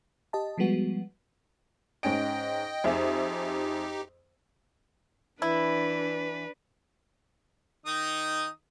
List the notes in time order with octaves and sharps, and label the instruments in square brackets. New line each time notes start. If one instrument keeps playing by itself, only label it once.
[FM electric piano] G4 D#5 A5
F3 G3 G#3 B3 F#4
[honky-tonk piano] G#2 C#4 D7 [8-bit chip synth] D#5 G5
[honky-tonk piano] F2 G#4 E5 [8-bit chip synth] D#4 G4
[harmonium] E3 [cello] D4 [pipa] E4 [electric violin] B4
[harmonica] D#3 D#4 D#6